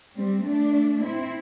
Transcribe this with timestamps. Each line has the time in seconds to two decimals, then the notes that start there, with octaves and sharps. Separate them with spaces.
0.16 G3 C4
0.44 A3 D4
1.01 C4 E4